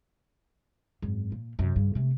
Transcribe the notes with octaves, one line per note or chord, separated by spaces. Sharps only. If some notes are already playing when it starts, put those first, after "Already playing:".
G#1 F#2
A#2
F#2 C3
G2 C#3
C3 A3